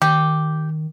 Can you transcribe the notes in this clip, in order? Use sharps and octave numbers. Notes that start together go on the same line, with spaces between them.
D#3 G4